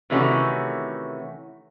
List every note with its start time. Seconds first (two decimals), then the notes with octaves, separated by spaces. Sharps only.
0.10 C3 D#3 E3 A3 C#4 F#4